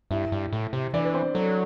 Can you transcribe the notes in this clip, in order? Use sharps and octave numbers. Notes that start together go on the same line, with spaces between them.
G2 E4 E5
G2
A2
C3
E3 D4 D5
B4
C4 C5
F#3 A4